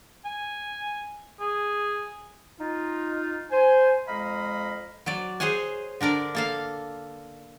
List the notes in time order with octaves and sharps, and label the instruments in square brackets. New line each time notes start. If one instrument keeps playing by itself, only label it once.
[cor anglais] G#5
G#4
[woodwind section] D#4 F4
C5 G#5
F2 G#3 D#5 F5 A#5 B5
[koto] F#3 C#5 D5
G#4 C5 C#5 F#5 G#5
D3 D4 A#4 D5
A#3 A4 F5